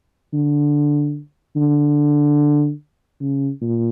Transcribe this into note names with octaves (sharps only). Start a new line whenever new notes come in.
D3
D3
C#3
A#2